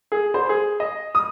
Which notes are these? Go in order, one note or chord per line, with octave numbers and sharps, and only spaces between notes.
G#4
C5
G#4
D#5
D#6